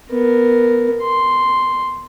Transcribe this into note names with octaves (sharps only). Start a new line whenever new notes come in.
B3 A#4
C6